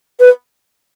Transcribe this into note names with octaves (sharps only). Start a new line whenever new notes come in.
B4